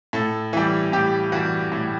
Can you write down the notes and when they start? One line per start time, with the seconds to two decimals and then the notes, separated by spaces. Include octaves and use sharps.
0.13 A2 A4
0.53 E3 G3
0.92 A2 G4
1.32 E3 G3 F#4
1.72 A2